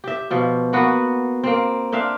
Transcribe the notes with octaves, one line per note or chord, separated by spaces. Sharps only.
G4 E5
B2 F3
A#3 B3 F#4 B4
A#3 C4
C4 D4 E5 F5